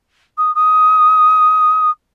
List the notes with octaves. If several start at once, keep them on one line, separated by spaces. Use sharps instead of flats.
D#6
D#6